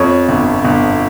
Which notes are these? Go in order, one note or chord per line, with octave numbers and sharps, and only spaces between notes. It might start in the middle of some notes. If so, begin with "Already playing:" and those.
Already playing: F2 C#5
G1
G1